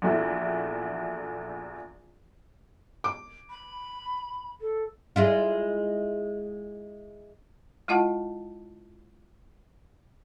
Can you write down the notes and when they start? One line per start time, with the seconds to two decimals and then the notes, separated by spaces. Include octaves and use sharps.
0.02 A#1 E2 A3 E4 F#4
3.04 D6
3.50 B5
4.61 A4
5.16 G#3 E4 F4
7.88 G#3 E4 F4 D#5 F#5 A5